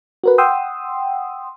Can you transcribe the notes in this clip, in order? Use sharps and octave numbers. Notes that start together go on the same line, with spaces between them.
F#4 A#4 B4
F#5 G5 C6 D#6 E6